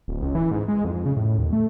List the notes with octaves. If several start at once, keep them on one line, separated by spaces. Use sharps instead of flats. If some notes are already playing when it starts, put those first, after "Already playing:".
D1
C#2
E3
G#2
G#3
F2
C#3
A2
D#2
A3